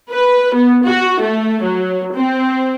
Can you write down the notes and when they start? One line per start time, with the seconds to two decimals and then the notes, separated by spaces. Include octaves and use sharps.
0.12 B4
0.54 B3
0.85 F#4
1.21 A3
1.63 F#3
2.15 C4